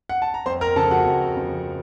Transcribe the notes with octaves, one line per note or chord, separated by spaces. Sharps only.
F#5
A5
A#5
F2 C5 C6
A#4 A#5
C#3 F3 A4 A5
F#4 F#5
F2
C#3 F3